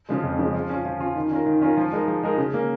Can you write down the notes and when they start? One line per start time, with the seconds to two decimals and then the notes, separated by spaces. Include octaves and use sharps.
0.09 C#3 F3 G#3
0.24 F2
0.39 C#3 F3 G#3
0.54 F3
0.69 C#4 F4
0.85 F3
1.01 C#4 F4
1.15 D#3
1.31 C#4 F4 A#4
1.46 D#3
1.62 C#4 F4 A#4
1.77 F3
1.92 G#3 D#4 A#4
2.08 F3
2.23 G#3 D#4 A#4
2.38 C#3
2.54 A#3 C#4